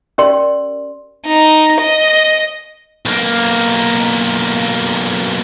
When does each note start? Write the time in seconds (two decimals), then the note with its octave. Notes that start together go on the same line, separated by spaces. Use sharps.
0.18 C#4 G4 A#4 D5 C6
1.27 D#4
1.81 D#5
3.06 B1 A#3